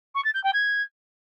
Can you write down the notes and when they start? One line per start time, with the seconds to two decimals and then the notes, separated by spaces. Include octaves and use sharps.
0.15 C#6
0.24 A6
0.34 G6
0.44 G5
0.53 G#6